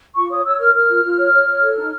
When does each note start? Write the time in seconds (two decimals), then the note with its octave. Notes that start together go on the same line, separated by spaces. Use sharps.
0.15 F4 C#6
0.30 C#5 D#6
0.44 C#5 E6
0.60 A#4 F6
0.74 A#4 F6
0.89 F4
1.04 F4
1.18 C#5
1.34 C#5
1.48 C#5
1.63 A4
1.77 D#4